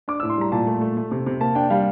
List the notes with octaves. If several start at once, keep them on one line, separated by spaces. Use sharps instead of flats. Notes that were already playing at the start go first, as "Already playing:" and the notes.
D4 D6
E6
A2
C6
G3 A#5
A#2 A5
A3
A3
A3
C3
C3
A#3 A5
D4 G5
G3 F5